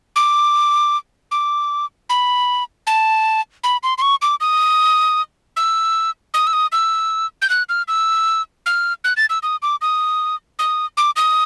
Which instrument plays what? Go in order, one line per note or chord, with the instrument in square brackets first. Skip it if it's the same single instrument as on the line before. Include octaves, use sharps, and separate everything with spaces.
[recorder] D6
D6
B5
A5
B5
C6
C6
C#6
D6
D#6
E6
D#6
E6
D#6
E6
G6
F#6
F6
E6
F6
F#6
A6
E6
D#6
D6
D#6
D#6
D6
D#6